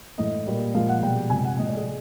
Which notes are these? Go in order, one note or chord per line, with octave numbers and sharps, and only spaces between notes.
A2 E3 G#3 D#5
A#2 G3
A#2 F3 G#3 F5
F#5
B2 G3 G5
C3 F3 G#3 G#5
F#5
A2 F3 G#3 D#5
D5
G#4